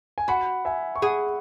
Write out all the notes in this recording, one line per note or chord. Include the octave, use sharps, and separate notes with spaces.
G#5
F#4 F#5 B5
E5 G#5
C#6
G#4 F#5 B5